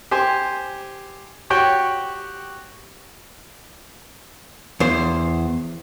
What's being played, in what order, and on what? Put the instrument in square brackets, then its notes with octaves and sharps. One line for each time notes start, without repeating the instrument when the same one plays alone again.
[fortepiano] G4 C5 G#5
F#4 G4 C#5 G5
[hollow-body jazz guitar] E2 C5